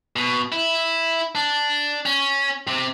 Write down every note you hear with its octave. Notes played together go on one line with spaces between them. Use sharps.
B2
E4
D4
C#4
C3